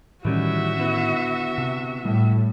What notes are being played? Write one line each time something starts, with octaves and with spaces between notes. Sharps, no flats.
A2 D#3 E3 G3 C#4 F#4 E5
D3 B3 E4
C3
A2 G3